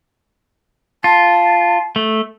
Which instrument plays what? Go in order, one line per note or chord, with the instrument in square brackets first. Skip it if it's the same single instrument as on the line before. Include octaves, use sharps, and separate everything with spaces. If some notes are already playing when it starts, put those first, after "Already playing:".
[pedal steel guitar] F4 [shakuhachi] A5
[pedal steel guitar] A3